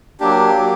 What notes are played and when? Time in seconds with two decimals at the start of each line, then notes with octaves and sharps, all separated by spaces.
0.20 F#3 A#3 D4 G4
0.57 F#3 A#3